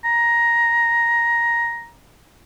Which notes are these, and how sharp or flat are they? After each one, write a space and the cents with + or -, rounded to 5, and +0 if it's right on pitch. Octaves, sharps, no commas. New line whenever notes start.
A#5 +10